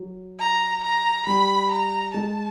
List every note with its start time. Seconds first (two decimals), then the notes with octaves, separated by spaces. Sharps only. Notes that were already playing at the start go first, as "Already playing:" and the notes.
Already playing: F#3
0.39 A#5
0.83 A#5
1.26 G3 B5
1.71 A#5
2.14 G#3 A5